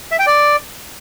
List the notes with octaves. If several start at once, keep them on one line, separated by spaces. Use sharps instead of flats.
E5
G5
D5